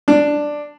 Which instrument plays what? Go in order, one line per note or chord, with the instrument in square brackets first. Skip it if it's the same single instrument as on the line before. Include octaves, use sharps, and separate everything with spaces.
[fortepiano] D4